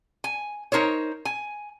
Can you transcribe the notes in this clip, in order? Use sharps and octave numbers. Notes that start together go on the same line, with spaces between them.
G#5
D#4 A#4 C5 C#5
G#5